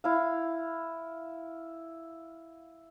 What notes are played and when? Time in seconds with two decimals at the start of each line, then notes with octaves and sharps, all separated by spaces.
0.04 E4 F5